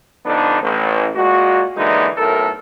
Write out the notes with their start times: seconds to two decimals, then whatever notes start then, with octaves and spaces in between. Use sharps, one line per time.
0.25 F2 D3 B3 D4 D#4
0.61 A1
1.14 A#2 G#3 F#4
1.76 D3 E3 G#3 A#3 D#4
2.18 B1 A2 A4 A#4